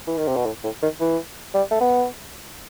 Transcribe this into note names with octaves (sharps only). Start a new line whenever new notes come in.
E3
D#3
C3
B2
A2
A2
D#3
E3
G3
A3
B3